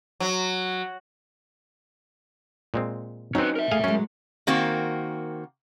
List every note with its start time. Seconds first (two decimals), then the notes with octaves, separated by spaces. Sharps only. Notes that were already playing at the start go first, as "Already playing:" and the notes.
0.20 F#3
2.74 A#2 G#3 C4
3.35 F#3 C4 C#4 D#4 B4
3.56 A#4 E5
3.71 D#2 A3 G#4 F5 G#5
3.84 F#3 G#3 C#4
4.47 D#3 A#3 C4 F#4